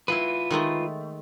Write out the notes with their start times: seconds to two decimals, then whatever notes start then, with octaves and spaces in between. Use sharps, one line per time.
0.08 B3 E4 F4 B4
0.51 D#3 G#3 A3